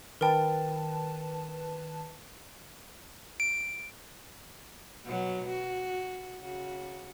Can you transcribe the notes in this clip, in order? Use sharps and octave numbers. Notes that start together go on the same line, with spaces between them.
D#3 A#4 B4 G5 A5
D7
B2 F#3
F#4
C#3 F#4